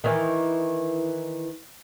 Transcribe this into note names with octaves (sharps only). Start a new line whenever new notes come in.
D#3 E3